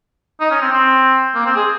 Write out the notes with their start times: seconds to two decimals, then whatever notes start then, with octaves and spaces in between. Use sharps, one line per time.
0.40 D#4
0.51 C#4
0.61 C4
0.72 C4
1.35 A#3
1.46 C4
1.56 G#4